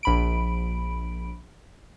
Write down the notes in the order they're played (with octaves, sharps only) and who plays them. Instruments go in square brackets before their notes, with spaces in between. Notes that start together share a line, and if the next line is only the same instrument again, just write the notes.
[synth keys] A#1 B5 D7